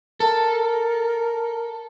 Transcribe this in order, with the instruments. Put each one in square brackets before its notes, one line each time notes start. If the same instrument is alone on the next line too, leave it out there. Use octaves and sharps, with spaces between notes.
[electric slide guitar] A4 [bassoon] A#4